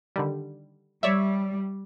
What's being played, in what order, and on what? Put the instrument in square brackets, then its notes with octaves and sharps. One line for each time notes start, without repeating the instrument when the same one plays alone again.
[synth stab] D3 D#3 G3
[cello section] G3 [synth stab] C#5 D5 E5